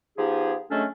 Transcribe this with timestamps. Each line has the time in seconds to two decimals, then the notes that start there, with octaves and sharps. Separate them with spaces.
0.18 F3 B3 D#4 G4 G#4
0.71 F#3 G#3 A3 C#4 D4 A4